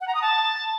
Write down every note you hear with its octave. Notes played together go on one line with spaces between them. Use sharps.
F#5
A#5
D#6
A5